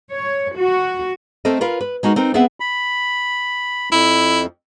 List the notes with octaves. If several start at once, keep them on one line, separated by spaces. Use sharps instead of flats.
C#5
F#4
A3 C4 A4 A#4 D#5
F4 A#4 B4 F5
B4
G#3 D#4 F#4 A#4
C4 D#4 A#4
B3 C4 G#4 B4 E5 F#5
B5
F2 E4